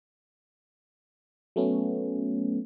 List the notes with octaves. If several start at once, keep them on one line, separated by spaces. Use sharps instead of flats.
F#3 A3 B3 C#4